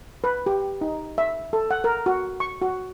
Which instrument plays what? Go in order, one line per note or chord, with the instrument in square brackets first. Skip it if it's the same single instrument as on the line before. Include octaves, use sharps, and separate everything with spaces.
[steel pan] B4
G4
D#4
E5
A4
F#5
A#4
F#4
C#6
F#4